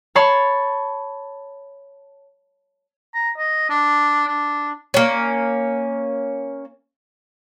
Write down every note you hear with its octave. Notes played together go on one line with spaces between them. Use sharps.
C#5 A5 B5 C#6 C7
A#5
D#5
D4
D4
A#3 C#4